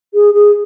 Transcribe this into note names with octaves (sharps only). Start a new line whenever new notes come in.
G#4
G#4